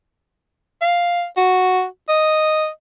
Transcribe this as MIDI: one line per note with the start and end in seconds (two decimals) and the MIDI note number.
0.82 1.25 77
1.37 1.85 66
2.08 2.68 75